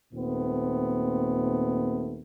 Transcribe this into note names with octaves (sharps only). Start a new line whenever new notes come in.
D#2 A#2 A3 B3 C4